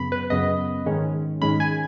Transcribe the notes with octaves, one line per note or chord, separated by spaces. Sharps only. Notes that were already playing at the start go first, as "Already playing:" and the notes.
Already playing: F#2 C#3 B3 B5
B4
F#2 C#3 B3 D#5
G#2 D#3 G#3 C#4
G#2 D#3 G#3 C#4 B5
G#5